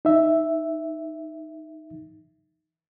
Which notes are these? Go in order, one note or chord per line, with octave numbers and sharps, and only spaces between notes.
D#4 E5